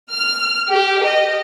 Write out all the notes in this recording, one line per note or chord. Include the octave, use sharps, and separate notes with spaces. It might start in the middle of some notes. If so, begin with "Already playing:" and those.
F6
G4
D#5